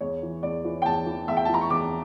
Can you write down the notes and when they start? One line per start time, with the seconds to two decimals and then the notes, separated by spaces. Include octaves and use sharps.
0.01 E2 C#5
0.23 E3
0.43 E2 D5
0.65 E3
0.82 G5
0.85 E2 A5
1.06 E3
1.28 E2 E5
1.37 G5
1.45 A5
1.49 E3
1.54 A#5
1.61 C#6
1.70 E2 D6